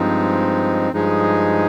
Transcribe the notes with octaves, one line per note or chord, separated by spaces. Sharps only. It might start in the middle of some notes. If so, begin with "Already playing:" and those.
Already playing: G2 F3 G#3 C4 D#4
G2 F3 G#3 D#4 G#4